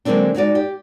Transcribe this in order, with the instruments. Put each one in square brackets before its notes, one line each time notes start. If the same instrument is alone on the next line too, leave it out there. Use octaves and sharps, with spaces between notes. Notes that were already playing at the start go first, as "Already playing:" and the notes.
[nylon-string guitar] D3 F#3 G#3 A#3 C4 D4
G#3 D#4 F#4 D5
G4